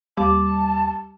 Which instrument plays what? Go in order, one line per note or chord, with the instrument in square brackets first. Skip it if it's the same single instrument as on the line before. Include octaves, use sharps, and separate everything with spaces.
[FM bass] D#2 [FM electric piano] G3 [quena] A5 [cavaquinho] D6